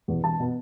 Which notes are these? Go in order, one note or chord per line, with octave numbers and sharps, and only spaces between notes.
E2 B2 B3
E1 A5
B2 B3